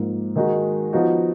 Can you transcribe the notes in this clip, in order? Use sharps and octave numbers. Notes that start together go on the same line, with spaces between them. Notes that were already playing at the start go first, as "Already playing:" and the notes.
Already playing: G#2 F3 A#3
D#3 G#3 D#4 F#4
F3 B3 D#4 F#4